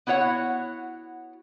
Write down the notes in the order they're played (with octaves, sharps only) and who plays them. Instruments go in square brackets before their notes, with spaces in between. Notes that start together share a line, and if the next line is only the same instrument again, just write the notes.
[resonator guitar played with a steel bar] B3 E4 F#4 C#5 F#5